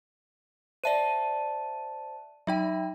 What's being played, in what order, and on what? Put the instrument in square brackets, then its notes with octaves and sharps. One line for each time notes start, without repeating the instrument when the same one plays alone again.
[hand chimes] C5 A5 [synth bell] D5 E5 D#7
[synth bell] F#3 D#4 G5 [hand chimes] E5